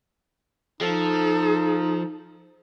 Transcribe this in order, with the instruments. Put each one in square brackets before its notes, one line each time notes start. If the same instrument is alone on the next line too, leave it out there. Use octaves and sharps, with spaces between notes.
[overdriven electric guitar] F3 [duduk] D#4 [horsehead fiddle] A4